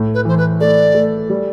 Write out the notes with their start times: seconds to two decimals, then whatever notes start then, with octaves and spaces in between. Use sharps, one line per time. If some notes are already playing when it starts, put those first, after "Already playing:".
Already playing: A2
0.14 B4
0.25 E3 C5
0.38 B4
0.60 A3 D5
0.95 A3
1.30 G3